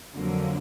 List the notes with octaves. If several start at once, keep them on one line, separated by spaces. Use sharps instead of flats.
F2 D3 F#3 A#3